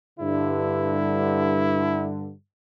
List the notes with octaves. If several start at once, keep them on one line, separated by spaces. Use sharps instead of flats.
G2 D3 E4